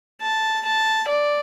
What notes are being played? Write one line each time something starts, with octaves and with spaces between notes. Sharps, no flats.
A5
A5
D5